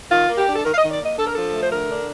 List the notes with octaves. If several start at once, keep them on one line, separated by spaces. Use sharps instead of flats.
D#3 F4
A#3
G4
D4
A4
D#3 A#4
F5
D#5
D#3
D5
A#3
D#5
D4 A4
A#4
F3 A4
A3
C5
D3 A#4
D4